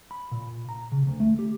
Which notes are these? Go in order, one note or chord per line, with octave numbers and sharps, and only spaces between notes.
B5
A#2
A#5
C#3
D2
A3
G4